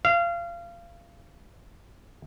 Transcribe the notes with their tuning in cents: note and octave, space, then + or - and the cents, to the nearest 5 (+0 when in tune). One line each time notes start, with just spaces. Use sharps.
F5 -25